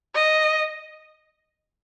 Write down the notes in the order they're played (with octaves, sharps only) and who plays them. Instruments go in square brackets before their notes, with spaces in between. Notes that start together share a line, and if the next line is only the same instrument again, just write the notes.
[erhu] D#5